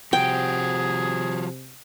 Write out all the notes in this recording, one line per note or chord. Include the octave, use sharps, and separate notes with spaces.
C3 F3 F#4 G#4 G5